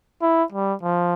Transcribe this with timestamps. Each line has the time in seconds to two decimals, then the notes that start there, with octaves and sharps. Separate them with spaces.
0.22 E4
0.52 G3
0.83 F3